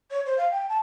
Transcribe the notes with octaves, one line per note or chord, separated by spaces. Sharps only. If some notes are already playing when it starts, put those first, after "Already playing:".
C#5
C5
F5
G5
A5